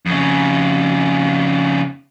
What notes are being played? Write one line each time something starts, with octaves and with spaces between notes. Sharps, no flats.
F2 C#3